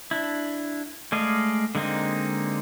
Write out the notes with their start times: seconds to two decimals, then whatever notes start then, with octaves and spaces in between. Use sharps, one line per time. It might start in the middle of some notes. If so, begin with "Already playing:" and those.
0.11 D4 E4
1.12 G#3 A3 D5 D#5 F5
1.75 D3 G#3 A#3 C4 D#4